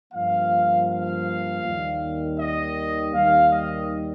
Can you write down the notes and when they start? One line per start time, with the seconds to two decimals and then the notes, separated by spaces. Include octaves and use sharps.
0.13 G2 F3 A#3 F5
0.89 F5
1.63 D#2 D#3 G3
2.38 D#5
3.13 D#2 D#3 G3 F5
3.51 D#5